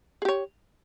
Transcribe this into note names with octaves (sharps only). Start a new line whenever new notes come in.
G4 G#4 C#5